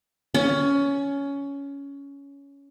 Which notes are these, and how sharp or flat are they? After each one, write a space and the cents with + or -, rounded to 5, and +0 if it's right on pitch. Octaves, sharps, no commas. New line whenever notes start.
C#4 +15